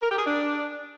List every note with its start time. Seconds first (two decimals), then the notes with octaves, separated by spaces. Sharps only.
0.02 A#4
0.10 G4
0.18 G#4
0.26 D4